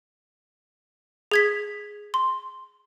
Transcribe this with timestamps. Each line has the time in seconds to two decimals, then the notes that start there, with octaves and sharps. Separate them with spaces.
1.32 G#4 G#6 B6
2.14 C6